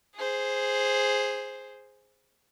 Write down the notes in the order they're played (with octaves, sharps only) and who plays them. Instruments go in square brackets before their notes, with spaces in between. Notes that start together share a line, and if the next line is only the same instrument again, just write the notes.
[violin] G#4 C5